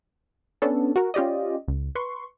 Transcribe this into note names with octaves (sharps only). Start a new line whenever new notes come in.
B3 C#4 D4 A4
F#4 A#4
C#4 F4 G4 D5 D#5
C#2
B4 C6 C#6